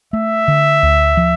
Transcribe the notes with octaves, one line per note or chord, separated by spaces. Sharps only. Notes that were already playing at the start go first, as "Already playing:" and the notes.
A3 E5
D3
D2
F3